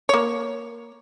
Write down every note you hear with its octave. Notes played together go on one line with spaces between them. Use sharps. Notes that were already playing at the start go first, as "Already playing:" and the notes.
A#3 C#5